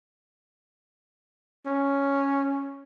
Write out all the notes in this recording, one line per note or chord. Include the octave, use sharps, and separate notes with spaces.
C#4